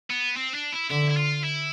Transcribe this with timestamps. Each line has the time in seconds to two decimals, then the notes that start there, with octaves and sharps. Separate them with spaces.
0.10 B3
0.36 C4
0.54 D4
0.72 E4
0.90 D3 E4
1.10 E4
1.17 F4
1.44 E4